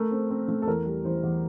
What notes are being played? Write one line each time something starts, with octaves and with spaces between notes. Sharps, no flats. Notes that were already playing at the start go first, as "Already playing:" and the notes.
Already playing: A3 A#4
C4
C4
A3
A4
E2 A#4
G3
E3 C5
E2